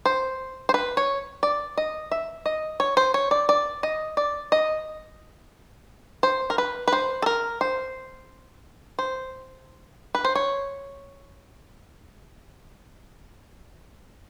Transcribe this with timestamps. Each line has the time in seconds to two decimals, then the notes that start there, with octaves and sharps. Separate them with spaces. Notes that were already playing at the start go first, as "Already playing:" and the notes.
0.06 C5
0.69 C5
0.74 B4
0.97 C#5
1.43 D5
1.77 D#5
2.11 E5
2.46 D#5
2.80 C#5
2.97 C5
3.14 C#5
3.31 D5
3.49 D5
3.83 D#5
4.17 D5
4.52 D#5
6.23 C5
6.50 A#4
6.58 B4
6.88 B4
6.93 C5
7.22 A4
7.26 A#4
7.61 C5
8.99 C5
10.15 B4
10.25 C5
10.35 C#5